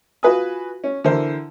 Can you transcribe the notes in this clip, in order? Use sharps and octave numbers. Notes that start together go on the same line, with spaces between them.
F4 F#4 B4 G#5 D#6
C#4
D3 E3 E4 A#4 C5